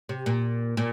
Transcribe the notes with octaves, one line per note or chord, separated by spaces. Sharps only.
C3
A#2
A#2